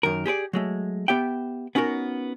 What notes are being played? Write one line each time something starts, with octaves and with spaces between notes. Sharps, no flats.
F#2 D#3 A#4
G4 G#4 B4 D5
F#3 G#3 A3
B3 G4 E5 G5
B3 C#4 D#4 F#4 A#4